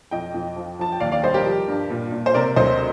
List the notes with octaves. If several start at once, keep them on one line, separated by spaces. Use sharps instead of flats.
F2 D#5 G5
F2
F3
F3 A5
G5
D#2 D5 F5
D5 F5
G3 C5 D#5
G4 A#4
F3
G2
A#2
A#2
C5
C3 A#4 D5
D2 C5 D#5